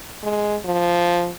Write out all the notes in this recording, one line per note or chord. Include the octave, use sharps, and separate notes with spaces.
G#3
F3